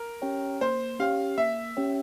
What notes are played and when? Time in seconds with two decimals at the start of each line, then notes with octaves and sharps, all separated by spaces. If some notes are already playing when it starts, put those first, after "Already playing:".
Already playing: A#4
0.22 C#4 G4 C#5 G5
0.61 A#3 C5
0.99 C#4 G4 C#5 F5 G5
1.37 A#3 E5
1.77 C#4 G4 C#5 G5